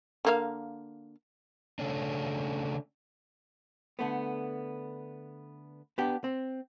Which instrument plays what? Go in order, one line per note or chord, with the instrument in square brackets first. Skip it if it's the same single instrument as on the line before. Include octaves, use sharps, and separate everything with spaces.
[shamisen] D3 A#3 F5
[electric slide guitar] C#3 A3 C#4 D4
[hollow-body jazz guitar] D3 A3 B3
B3 D4 G4
C4